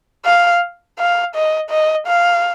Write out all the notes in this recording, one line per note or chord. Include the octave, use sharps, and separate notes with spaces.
F5
F5
D#5
D#5
F5